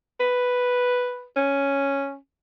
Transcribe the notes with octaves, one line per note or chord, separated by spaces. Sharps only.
B4
C#4